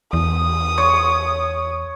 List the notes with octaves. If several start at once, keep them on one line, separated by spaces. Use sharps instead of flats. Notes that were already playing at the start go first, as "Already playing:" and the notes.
E2 D#6
C#5